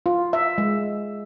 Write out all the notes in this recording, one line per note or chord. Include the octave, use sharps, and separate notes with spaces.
F4
E5
G#3